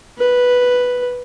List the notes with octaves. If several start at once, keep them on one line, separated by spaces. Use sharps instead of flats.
B4